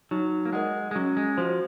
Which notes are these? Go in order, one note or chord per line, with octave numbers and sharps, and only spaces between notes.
F#3 D#4
A#3
G#3 A#4 D#5 F#5
G#3
F#3 C#4
G#3
F3 F#4 C5